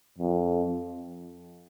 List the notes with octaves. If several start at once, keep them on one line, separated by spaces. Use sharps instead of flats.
F2